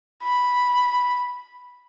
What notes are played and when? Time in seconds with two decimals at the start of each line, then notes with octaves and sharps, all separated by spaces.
0.23 B5